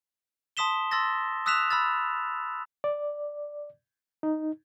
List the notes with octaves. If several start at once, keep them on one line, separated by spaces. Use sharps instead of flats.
A5 C6 D#6 B6 E7 G7
C6 E6 A6 A#6
D#6 E6 F#6 B6 E7 F7
B5 E6 F6 A6
D5
D#4